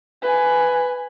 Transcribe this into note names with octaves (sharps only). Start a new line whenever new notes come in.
B4 G#5